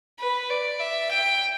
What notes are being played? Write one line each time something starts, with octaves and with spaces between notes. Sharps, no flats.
B4
D5
E5
G5